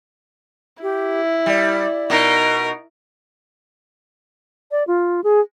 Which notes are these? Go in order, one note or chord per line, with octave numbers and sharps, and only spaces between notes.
E4 G4
G3 D5
B2 D#4 A#4
D5
F4
G#4